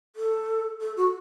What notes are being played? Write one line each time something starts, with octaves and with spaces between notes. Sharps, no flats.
A4
A4
F#4